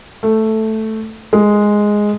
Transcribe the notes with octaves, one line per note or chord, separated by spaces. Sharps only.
A3
G#3